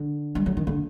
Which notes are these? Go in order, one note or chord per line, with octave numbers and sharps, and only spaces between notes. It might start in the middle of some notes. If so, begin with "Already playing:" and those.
Already playing: D3
G3
F#3
D#3
D3